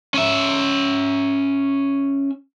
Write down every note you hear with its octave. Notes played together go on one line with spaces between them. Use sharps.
C#4 E5